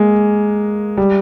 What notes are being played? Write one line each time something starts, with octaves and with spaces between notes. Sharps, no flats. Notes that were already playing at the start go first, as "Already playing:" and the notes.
Already playing: G#3 A#3
G3